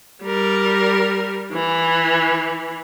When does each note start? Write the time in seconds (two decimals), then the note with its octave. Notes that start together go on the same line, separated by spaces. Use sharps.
0.23 G3 A#4
1.52 E3